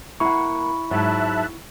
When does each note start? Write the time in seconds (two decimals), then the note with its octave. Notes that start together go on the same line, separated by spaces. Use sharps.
0.20 A#3 E4 F#5 B5 C#6
0.91 G#2 F#3 E5 A5 F#6